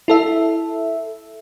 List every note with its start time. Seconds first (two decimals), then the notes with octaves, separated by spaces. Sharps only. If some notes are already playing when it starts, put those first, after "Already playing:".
0.08 E4 A4 E5